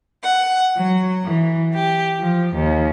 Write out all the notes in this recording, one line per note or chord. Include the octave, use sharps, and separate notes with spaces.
F#5
F#3
E3
G4
F3
D#2